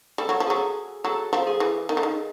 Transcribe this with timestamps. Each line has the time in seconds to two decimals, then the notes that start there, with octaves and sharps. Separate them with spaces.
0.18 G3 A4
0.29 F#3
0.40 F3
0.47 F#3 G#4
1.04 F#3 A4
1.33 F3
1.47 G#4
1.60 E3
1.89 D#3 D#4
1.97 D3
2.03 D#3